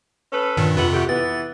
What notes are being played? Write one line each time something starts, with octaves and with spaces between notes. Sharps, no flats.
C#4 A4 B4
G2 A#2 D#3
F2 C3 F4 B4 E5 F#5
A3 F#4 G4
E3 B3 A6